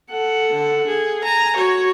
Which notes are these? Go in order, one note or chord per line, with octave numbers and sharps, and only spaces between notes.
A4 F#5
D3
G#4
G#5 A#5
F#4 C#5